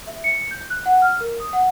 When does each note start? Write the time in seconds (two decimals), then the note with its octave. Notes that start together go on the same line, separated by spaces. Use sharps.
0.07 E5
0.24 C#7
0.51 G6
0.70 F#6
0.86 F#5
1.02 F6
1.21 A#4
1.40 D#6
1.53 F#5